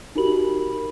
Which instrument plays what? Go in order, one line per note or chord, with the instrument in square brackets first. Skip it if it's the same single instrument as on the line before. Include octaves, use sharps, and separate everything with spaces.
[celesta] D#4 F#4 G4 A#4 B5 F#7